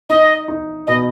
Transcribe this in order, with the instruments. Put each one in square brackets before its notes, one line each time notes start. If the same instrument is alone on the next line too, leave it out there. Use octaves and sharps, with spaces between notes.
[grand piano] D#4 [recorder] D#5
[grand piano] D#4
[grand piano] B2 [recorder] D#5